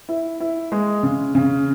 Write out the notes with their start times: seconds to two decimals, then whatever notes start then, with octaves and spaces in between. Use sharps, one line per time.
0.09 E4
0.40 E4
0.72 G#3
1.03 C#3
1.35 C#3